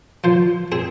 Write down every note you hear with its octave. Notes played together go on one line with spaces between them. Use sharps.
F3 C5
C4 G#4